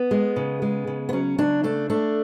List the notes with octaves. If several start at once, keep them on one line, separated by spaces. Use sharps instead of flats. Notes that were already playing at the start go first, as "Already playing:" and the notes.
Already playing: B3
G#3
C#3
G#3
C#3
B3
F#3 C#4
C#3 D4
A3 D4
A3 D4